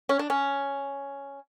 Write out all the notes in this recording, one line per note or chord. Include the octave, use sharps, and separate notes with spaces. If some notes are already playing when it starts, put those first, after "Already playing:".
C#4
D4
C#4